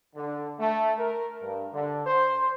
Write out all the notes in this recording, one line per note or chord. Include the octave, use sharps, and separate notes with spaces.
D3
A3
A#4
G2
D3
C5